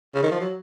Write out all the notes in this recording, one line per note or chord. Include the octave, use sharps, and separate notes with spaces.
C#3
D#3
F3
F#3